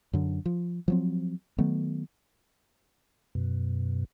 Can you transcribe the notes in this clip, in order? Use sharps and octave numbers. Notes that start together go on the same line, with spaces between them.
F#2 D3
F3
F3 F#3 C4
D#3 F#3 A3 B3
F#2 B2